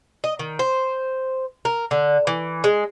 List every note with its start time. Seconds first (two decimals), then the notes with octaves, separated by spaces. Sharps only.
0.24 D#5
0.39 D#3
0.59 C5
1.65 A#4
1.91 D3
2.27 E3
2.64 G#3